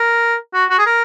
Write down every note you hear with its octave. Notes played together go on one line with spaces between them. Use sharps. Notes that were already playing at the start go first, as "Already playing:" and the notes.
Already playing: A#4
F#4
F#4
G#4
A#4